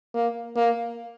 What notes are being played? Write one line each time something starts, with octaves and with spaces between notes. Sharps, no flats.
A#3
A#3